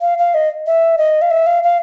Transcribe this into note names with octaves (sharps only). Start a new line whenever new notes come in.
F5
F5
D#5
E5
D#5
F5
E5
F5
F5